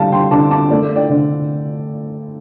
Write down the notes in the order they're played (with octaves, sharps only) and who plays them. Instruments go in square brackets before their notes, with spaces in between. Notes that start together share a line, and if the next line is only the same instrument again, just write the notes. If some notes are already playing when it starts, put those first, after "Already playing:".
Already playing: [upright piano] D3 G3 F5 A5
G5 C6
D3 A5 D6
A5 D6
A3 A4 D5
D5 G5
D3